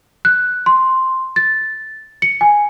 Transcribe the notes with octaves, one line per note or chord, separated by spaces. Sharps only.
F#6
C6
A6
C#7
G#5